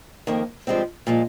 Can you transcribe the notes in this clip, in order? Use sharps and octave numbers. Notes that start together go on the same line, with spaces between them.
F2 D#3 A#3
G2 F3 G#3 C4 G4
A#2 F3 G#3